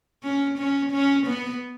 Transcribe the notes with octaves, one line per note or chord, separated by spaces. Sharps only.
C#4
C#4
C#4
B3